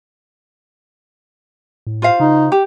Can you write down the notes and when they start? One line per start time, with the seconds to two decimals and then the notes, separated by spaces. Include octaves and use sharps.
1.87 A2
2.02 F4 C5 F5
2.20 C#3 D#4
2.52 G4